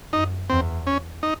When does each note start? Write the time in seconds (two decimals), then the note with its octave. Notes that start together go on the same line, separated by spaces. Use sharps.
0.13 F#2 D#4
0.50 E2 C4
0.87 C#4
1.23 D#4